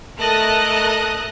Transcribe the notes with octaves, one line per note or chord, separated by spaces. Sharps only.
A3 A#4 D#5 A5 D#6 F#6